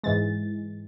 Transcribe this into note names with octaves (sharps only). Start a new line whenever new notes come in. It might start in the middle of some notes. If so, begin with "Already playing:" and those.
G#2 E3 G#3 A6